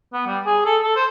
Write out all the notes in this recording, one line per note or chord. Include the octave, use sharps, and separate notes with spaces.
B3
G3
G#4
A4
A4
C5